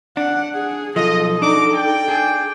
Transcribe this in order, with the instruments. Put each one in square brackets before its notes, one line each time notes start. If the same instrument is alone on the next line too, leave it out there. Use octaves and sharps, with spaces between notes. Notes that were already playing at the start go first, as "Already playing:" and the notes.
[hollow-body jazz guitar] D4 [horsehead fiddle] F#5
[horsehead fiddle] G#4
[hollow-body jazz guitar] B1 F3 [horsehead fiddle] A4 [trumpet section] D#5
[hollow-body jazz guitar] D4 [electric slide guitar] D#4 [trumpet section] F#4 A#5 D6
[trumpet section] D5 G5
[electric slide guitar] G#4 G#5 A5